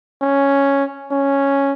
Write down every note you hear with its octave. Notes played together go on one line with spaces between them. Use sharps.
C#4
C#4